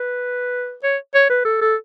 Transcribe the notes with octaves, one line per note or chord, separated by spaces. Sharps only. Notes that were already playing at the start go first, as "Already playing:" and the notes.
Already playing: B4
C#5
C#5
B4
A4
A4